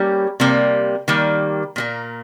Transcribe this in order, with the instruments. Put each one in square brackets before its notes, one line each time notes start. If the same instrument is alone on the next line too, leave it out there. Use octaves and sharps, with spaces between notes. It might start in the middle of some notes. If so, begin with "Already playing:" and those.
Already playing: [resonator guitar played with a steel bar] G3 A#3 C#4 G4
C3 G3 A#3
D#3 G3 A#3
A#2 G3 A#3